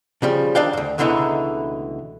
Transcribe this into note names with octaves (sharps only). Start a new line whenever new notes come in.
C#3 F3 G3
D#3 D4 D5 F5 G5
D2 G2
C#2 B2 D3 E3 A3 D#4